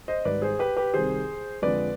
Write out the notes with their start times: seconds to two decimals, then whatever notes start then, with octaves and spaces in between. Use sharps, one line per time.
0.08 C5 D#5
0.25 G#2 D#3 G3 B4 D5
0.42 G#4 C5
0.59 G4 B4
0.76 G4 B4
0.94 C2 C3 D#3 G#4 C5
1.62 F2 D3 F3 G#3 B4 D5